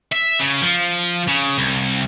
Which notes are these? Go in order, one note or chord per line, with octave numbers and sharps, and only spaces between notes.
E5
C#3
F3
C#3
C2